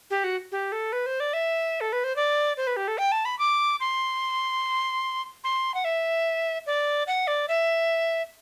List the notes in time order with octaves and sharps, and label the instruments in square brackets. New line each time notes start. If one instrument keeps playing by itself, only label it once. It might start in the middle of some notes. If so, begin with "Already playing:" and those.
[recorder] G4
F#4
G4
A4
B4
C5
D5
E5
A4
B4
C5
D5
C5
B4
G4
A4
G5
A5
B5
D6
C6
C6
F#5
E5
D5
F#5
D5
E5